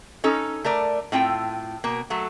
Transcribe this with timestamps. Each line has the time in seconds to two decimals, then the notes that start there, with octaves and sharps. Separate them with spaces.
0.24 C#4 D#4 A4
0.64 A3 A#4 D5
1.12 A2 C4 F4 G5
1.84 B2 A#3
2.10 F#3 A3